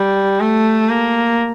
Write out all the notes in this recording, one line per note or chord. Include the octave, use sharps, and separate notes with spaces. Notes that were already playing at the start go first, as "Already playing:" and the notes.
Already playing: G3
A3
A#3